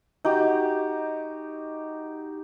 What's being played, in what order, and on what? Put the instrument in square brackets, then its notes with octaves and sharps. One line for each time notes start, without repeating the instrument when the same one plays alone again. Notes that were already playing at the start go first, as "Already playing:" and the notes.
[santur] D#4 F#4 G4